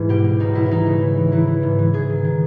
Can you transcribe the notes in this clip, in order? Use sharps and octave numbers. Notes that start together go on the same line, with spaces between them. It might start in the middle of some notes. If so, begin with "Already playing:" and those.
Already playing: G#2 E3 E4
B2 G4
B2
C#2 D#4
B2 E4
E4
E3 D#4
C#3
E3
E3
E3 E4
E3
G#2
E3
G#2 G#4
D#3
D#3